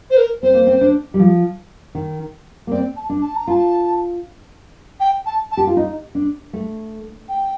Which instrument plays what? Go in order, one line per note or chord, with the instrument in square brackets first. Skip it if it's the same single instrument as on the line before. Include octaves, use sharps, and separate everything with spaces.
[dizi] C5
A#4
[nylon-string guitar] C4 [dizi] C5
[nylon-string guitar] A#3
C4
D4
G3
F3
D#3
A#3
[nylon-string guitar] C4 [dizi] D5
[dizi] A5
[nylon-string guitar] D4
[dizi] A5
A#5
[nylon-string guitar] F4 [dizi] A5
[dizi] G5
A5
A5
[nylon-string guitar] G4
F4
D#4
D4
A3
[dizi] G5